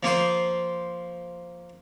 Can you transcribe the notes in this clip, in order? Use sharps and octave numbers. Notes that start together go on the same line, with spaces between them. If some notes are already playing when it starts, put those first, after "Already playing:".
F3 A#3 F4 C5